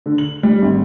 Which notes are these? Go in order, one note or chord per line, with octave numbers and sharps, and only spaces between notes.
D3
F#7
G3
G#1